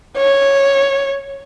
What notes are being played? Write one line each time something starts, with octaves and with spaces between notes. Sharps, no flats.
C#5